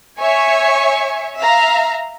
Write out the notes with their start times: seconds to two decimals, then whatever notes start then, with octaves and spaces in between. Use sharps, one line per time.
0.19 C#5 E5 G#5 C#6
1.38 E5 F5 A#5